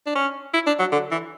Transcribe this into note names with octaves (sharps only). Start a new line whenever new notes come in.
D4
C#4
E4
D4
F#3
D3
E3